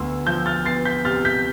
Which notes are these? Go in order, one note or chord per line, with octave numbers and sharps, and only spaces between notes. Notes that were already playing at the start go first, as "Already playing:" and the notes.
Already playing: D2 B3 C6 E6
F3 E6 G6
F6 A6
B3 A6 C7
G6 B6
C3 F6 A6
G6 B6